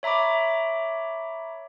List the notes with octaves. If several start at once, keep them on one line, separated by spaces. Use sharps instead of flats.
C#5 E5 A#5 B5 D6